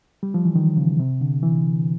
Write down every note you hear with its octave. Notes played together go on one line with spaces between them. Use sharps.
G3
F3
E3
D#3
C#3
C3
D3
E3